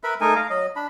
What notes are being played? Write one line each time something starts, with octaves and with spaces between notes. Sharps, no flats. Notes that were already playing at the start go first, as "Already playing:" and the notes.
A#4 B4 E5 B5
A3 D#4 A#4 G#5
F5 A#5
F#3 D#5
D4 B5